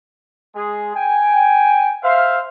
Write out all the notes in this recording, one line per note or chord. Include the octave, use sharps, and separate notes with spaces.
G#3 G#4
G5 G#5
C5 E5 F5